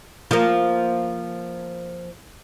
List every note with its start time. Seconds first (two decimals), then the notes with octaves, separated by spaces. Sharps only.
0.31 F3 A#3